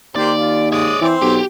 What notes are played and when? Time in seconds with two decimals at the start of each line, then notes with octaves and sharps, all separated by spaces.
0.16 D#2 A#3 G4 C5 D5
0.40 F4
0.72 G#3 C#5 D5 D#6
1.01 E3 C4 C5
1.22 B1 G4